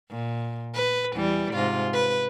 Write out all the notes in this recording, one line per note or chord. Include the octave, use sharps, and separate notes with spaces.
A#2
B4
E2 E3 G3
G#2 C3 F4
B4